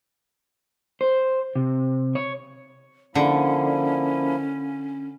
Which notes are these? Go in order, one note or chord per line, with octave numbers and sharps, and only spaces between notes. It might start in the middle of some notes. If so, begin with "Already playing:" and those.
C5
C3
C#5
D3 F3 A#3 C#4 E4